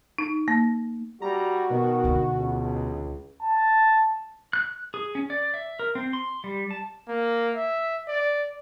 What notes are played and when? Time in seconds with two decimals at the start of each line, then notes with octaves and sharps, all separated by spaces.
0.18 D#4
0.48 A#3
1.22 G3 F#4 A#5
1.70 B2 D#3
2.04 D2 D3
2.39 C#2
3.42 A5
4.53 F#6
4.94 G#4
5.15 C#4
5.30 D5
5.54 E5
5.79 A#4
5.95 C4
6.13 C6
6.44 G3
6.71 A5
7.09 A#3
7.55 E5
8.08 D5